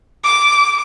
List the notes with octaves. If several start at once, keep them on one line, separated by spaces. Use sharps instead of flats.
D6